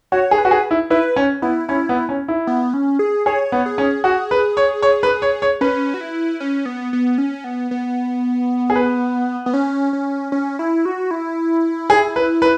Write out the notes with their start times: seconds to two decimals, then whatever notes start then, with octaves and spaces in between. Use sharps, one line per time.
0.12 F#4 C#5
0.31 G#4
0.38 B4
0.45 F#4
0.51 G#4
0.71 E4
0.90 E4 B4
1.16 C#4
1.42 B3 E4
1.68 C#4 E4
1.89 B3
2.09 C#4
2.28 E4
2.47 B3
2.74 C#4
2.99 G#4
3.26 G#4 C#5
3.52 B3
3.66 G#4
3.78 C#4
4.04 F#4 G#4
4.31 B4
4.57 C#5
4.82 C#5
5.03 B4
5.22 C#5
5.42 C#5
5.61 C#4 B4
5.94 F#4
6.01 E4
6.40 C#4
6.66 B3
6.93 B3
7.18 C#4
7.44 B3
7.71 B3
8.70 G#4
8.76 B4
9.46 B3
9.54 C#4
9.93 C#4
10.32 C#4
10.59 E4
10.85 F#4
11.11 E4
11.90 G#4
12.16 B4
12.42 B4